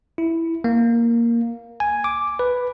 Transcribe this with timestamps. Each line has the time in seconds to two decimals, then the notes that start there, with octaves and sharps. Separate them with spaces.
0.18 E4
0.64 A#3
1.80 G#5
2.04 D6
2.39 B4